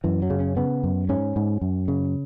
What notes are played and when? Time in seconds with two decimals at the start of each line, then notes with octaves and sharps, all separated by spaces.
0.04 F#2 E3
0.22 F#3
0.30 C#3
0.40 C#4
0.57 C#3 B3
0.84 F#2
1.09 G#2 C#4
1.36 G#2
1.62 F#2
1.88 C#3